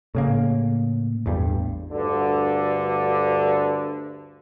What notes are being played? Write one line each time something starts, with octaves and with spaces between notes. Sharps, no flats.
A2 C#3 A#3
A1 E2 G2
D2 G2 D3